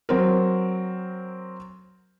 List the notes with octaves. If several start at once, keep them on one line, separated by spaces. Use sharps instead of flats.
F#3 C4 A#4